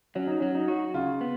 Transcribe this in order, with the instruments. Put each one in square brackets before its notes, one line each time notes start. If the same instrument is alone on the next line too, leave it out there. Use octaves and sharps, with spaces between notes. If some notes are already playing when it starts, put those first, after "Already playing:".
[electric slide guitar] F#3 [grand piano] C#4
[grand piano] D#4
[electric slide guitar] F#3 [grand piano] C#4
[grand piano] D#4
[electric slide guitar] F#4
[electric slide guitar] C#3 [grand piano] F4
[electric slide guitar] B3